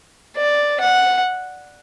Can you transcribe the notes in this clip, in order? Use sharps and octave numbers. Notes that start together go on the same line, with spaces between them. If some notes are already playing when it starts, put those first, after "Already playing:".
D5
F#5